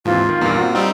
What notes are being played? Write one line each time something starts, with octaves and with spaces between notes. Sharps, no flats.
D#2 G#2 E3 C4 F4
D#3
E2 G2 A#2 A#3
C4 F#4
G3 C4 D#4 G5 E6